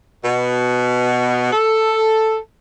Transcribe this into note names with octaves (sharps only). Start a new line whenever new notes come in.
B2
A4